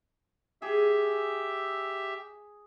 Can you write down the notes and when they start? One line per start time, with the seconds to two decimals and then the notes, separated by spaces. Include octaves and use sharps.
0.62 G4 G#4 E5 E6